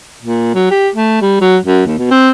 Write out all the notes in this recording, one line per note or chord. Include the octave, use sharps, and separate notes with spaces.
A#2
F#3
G4
A3
G3
F#3
F#2
D#2
B2
C4